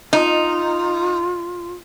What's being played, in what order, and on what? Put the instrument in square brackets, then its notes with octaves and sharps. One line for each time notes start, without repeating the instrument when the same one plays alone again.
[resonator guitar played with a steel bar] D#4 [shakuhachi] F4